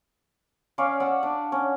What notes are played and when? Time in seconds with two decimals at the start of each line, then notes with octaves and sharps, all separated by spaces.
0.78 C#4 C#5 D5 F5
1.00 D5 F#5 D#6 E6
1.23 D4
1.52 C#4